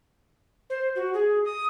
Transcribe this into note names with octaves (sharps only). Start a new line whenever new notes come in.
C5
F#4
G#4
D#6